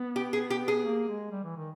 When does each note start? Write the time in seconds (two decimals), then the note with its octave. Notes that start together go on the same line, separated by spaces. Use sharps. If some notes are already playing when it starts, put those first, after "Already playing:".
Already playing: B3
0.16 G4
0.33 G#4
0.50 G4
0.68 G#4
0.85 A#3
1.09 G#3
1.31 G3
1.44 E3
1.57 D#3